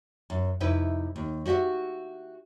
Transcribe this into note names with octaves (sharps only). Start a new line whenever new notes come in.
F#2
F2 C3 D#4 E4 B4
D#2
F#4 G4 D#5 E5 F#5